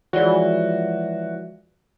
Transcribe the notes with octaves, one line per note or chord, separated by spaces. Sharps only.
E3 F3 G#3 F4 F#4 C#5 D5 G7